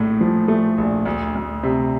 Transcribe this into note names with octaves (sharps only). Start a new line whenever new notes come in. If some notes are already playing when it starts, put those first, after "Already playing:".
Already playing: A#1 A2 A3
F3
A3
A#1
D2
D2
C3